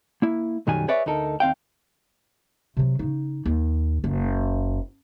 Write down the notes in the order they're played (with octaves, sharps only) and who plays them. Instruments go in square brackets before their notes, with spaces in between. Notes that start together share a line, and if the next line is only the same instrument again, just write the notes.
[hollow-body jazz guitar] A#3 E4
B1 F#2 D#3 F#3 G3 G#5
G#4 B4 C#5 D5 E5
D2 D#4 A4 A#4
D#2 C4 F5 G5
[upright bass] C3 F#3
C#3 D#4
D#2
F#1